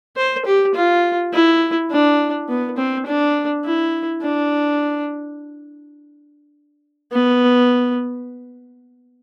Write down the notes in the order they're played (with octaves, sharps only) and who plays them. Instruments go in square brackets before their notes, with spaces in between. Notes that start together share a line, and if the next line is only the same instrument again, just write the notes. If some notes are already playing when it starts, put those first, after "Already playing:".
[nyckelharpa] C5
G4
F4
E4
D4
B3
C4
D4
E4
D4
B3